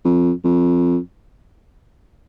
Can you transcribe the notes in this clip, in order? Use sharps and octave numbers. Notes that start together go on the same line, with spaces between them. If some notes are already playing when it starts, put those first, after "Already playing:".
F2
F2